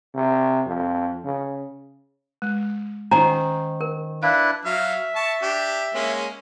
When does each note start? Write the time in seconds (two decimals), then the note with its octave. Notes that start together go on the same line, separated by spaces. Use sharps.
0.15 C3
0.66 F2
1.25 C#3
2.42 G#3
3.11 D#3 C#4 D#4 C5 G#5 A#5
3.81 A#4
4.23 D4 E4 B4 F5
4.65 F#3 E5 F5
5.16 A5 C#6
5.42 D4 G4
5.95 G#3 A#3 C#4